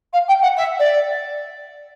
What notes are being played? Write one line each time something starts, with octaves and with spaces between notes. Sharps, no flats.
F5
G5
F#5
E5
D5